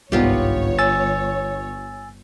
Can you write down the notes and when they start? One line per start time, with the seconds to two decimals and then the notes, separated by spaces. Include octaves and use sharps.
0.12 G1 C2 G#2 B3 F4 G4 C#5
0.79 G#5 E6 A6